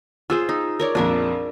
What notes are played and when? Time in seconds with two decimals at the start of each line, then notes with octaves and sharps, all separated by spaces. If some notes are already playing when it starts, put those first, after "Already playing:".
0.30 F4 G#4 C5 E6
0.49 D#4
0.80 A#4 C#5 D5
0.95 A#1 F2 D4 A#4 E5